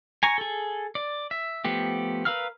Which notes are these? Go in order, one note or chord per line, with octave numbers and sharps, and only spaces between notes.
G#5 A#5 C#6
G#4 A4
D5
E5
F3 A3 B3 G4
A#4 B4 F5 E6 F6